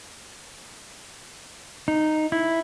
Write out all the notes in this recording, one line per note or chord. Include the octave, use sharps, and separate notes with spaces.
D#4
E4